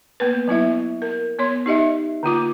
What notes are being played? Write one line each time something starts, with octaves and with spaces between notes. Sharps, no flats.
A#3 B3 B4
F#3 B3 E4 E5
A#4
B3 C#5 C6
D#4 G4 D#5 E5
D3 A#3 F4 D6